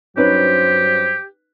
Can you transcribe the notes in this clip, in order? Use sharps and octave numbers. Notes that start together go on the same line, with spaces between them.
G2 F#3 C#4 D#4 G4 B4 C5